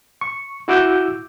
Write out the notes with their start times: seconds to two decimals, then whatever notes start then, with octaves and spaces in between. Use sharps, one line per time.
0.21 C#6
0.68 E4 F#4 D6 E6 G6